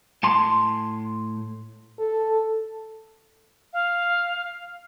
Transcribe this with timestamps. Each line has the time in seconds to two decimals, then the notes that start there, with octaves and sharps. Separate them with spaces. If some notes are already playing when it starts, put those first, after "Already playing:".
0.23 A2 A5 C6
1.99 A4
3.73 F5